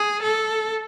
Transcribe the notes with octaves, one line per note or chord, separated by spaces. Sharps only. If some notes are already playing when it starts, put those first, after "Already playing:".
Already playing: G#4
A4